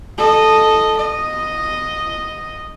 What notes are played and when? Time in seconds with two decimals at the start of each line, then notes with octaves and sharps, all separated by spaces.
0.18 A4 D#5
0.97 D#5